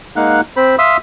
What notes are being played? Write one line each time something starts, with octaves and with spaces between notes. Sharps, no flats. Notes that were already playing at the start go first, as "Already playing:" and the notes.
G#3 A#3 D#4 F5 F#5 F#6
C4 C5 B5
E5 F5 C6 D#6 E6